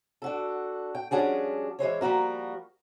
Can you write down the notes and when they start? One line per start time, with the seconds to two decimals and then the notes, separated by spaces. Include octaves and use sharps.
0.22 D4 F#4 A4
0.95 G5
1.11 F3 G3 C#4 D4 F#4 G#4
1.79 E3 G#3 C5 C#5
2.01 F3 G3 A#3 F#4 A#4